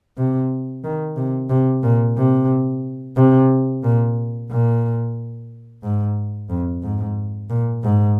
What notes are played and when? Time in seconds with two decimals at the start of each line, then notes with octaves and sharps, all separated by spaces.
0.18 C3
0.84 D#3
1.17 C3
1.50 C3
1.83 A#2
2.17 C3
3.16 C3
3.84 A#2
4.51 A#2
5.83 G#2
6.50 F2
6.83 G#2
7.50 A#2
7.83 G#2